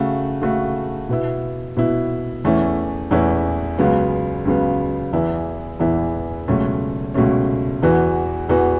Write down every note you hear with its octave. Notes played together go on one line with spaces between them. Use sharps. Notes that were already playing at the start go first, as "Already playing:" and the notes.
Already playing: C#3 A3 F#4
C#3 A3 F#4
B2 B3 E4
B2 B3 E4
E2 E3 A3 C#4 E4
E2 E3 A3 C#4 E4
C#2 C#3 F#3 B3
C#2 C#3 F#3 B3
E2 E3 B3 E4
E2 E3 B3 E4
C#2 B2 F#3 A3 C#4
C#2 B2 F#3 A3 C#4
E2 E3 B3 F#4
E2 E3 B3 F#4